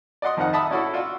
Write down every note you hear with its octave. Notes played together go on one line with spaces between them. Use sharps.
D5 D#5 F#5 C6 D#6
F2 D#3 F3 D#4 F#5
E5 A5 B5 D#6
C#4 D4 E4 F#4 A4 D5
F4 F#4 D5 E6